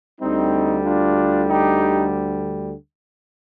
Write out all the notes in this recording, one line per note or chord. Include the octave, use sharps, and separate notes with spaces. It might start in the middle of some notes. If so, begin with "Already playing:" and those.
D2 D3 G3 C4 D#4
D4 F4
D#4 G4